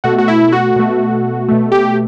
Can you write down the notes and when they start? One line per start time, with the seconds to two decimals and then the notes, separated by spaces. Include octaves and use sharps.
0.04 B2 A3 F#4
0.18 F#4
0.28 E4
0.52 F#4
0.76 B2 A3
1.48 B2 A3
1.72 G4